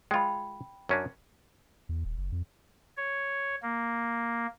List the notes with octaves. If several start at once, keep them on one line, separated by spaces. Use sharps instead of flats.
G#3 F4 G5 B5
F#2 C#4 D4
E2
D#1
F#1
F2
C#5
A#3